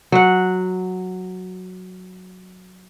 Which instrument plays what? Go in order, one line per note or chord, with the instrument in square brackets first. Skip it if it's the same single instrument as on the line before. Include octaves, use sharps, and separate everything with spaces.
[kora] F#3 F#5